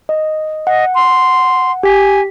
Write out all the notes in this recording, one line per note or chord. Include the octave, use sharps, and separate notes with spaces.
D#5
D#5 F#5
C6
G4 G#5 B6